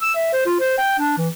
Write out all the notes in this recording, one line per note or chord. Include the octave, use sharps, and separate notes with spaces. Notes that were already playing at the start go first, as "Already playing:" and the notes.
E6
E5
C5
F4
C5
G5
D4
E3